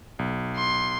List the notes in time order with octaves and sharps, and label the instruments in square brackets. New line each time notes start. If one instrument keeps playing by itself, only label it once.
[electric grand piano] B1
[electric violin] C6